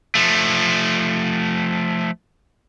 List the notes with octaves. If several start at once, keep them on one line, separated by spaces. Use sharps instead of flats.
F3 A3